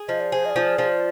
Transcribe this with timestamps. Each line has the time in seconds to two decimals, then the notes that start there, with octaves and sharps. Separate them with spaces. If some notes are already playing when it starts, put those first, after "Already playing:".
Already playing: G#4
0.08 F3 D#5
0.20 D5
0.32 G#4 C5
0.45 D#5
0.50 D5
0.56 F3
0.78 F3